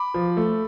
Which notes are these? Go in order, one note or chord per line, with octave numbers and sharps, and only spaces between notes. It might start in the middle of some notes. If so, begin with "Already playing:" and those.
Already playing: B5 D6
F3
A3